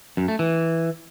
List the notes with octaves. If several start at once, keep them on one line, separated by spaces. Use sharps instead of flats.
F#2
A3
E3